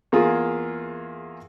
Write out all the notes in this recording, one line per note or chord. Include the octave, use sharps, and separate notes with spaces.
E2 A#3 F4 G#4